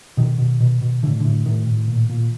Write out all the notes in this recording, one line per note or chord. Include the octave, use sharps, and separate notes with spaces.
B2 D#3
B2
B2
B2
A2 D3
A2 D3
A2 D#3
A2
A#2
A#2